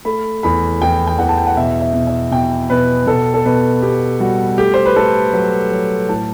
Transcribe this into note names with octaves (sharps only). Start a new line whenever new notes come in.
A3 B5
E2 B5
E2 G5
G5
E2 F#5
A5
G5
F#5
B2 E5
E5
B2
E5
B2 G5
B2 B4
B2 A4
A4
B2 B4
B3 G4
G3 F#4
A3 G4
C5
B4
A3 A4
F#3 B4
F#3
A2 A5